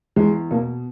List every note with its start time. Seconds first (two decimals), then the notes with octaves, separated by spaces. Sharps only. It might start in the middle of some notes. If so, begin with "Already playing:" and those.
0.16 E2 G#3
0.51 B2 A#3